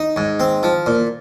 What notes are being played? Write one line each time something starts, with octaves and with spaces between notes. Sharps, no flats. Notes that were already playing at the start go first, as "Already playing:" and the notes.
Already playing: D#4
G#2
C4
F3
A#2